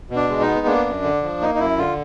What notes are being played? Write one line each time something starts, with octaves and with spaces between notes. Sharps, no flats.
B2
D4
G#3
D#4
B3
A#3 D4
F#2
D3
F3
A#3 D#4
D#4
F#2 E4
D3 F4